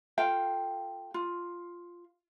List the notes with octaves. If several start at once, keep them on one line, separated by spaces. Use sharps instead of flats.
F4 A4 F5 G5
F4